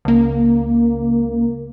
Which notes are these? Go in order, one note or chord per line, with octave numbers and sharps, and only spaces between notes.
C#2 A#3